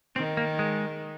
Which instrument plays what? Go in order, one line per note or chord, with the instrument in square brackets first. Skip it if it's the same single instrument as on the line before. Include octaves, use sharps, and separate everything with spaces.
[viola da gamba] D#3 [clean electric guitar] C4
[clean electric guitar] A#3
G#3